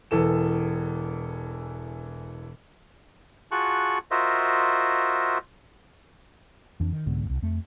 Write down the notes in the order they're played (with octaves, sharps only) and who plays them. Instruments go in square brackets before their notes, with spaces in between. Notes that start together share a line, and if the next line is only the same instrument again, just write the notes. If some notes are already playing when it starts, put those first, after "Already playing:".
[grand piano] E1 E3 A4 E7
[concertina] F4 F#4 G#4 A5 C#6 F#6
F4 F#4 A#4 C5 D#5 E5
[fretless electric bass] F2 E3 D4
D#3
C2 G#2 D3 B3
D#1 C2
F2 A3